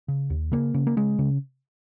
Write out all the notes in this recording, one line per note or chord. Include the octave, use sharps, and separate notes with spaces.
C#3
D#2
C#3 A#3
C#3
A#3
C#3 G#3
C#3